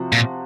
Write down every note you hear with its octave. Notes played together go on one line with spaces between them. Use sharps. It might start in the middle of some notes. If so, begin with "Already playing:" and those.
Already playing: C3 F3 C4 F#4
A#2